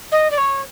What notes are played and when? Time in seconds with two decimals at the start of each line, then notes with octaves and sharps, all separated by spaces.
0.11 D#5
0.30 D5
0.38 C#5